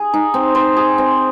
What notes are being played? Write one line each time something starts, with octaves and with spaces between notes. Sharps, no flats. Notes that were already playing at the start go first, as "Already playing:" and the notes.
Already playing: G#4
D#4
C4
C5
G#4
C4